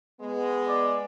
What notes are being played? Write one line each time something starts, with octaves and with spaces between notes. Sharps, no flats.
G#3 B3
D5